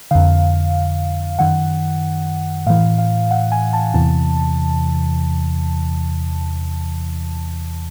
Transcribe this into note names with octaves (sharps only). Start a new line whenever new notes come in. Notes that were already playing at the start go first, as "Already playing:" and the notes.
F2 D3 F5
F#2 D#3 F#5
A2 E3 F5
F5
F#5
G#5
A5
E2 C3 E3 A5